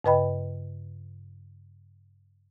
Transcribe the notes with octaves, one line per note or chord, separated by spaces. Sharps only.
G2 C#3 B4 D#5 G5 B5